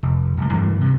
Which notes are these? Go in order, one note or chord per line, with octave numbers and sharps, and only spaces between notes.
F1
D1 C#2
G2 E3 G3 A3
D2 C3